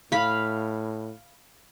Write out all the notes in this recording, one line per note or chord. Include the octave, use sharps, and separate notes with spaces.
A2 F5 B5